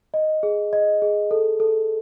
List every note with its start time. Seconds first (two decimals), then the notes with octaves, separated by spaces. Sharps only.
0.14 D#5
0.43 G#4
0.73 D#5
1.02 G#4
1.31 A4
1.60 A4